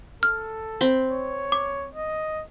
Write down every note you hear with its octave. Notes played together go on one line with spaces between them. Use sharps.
A4 F6
C4 B5
C#5
D6
D#5